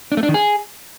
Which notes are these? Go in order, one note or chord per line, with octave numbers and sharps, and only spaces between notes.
D4
A3
D4
D#3
G#4